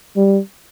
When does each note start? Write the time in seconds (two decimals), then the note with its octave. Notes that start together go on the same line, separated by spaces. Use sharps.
0.16 G3